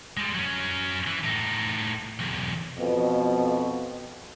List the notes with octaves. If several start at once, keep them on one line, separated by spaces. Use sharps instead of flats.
G3 G#3
F#3 C#4
E3
A2 D#4
B1 E2
F2 B2 B3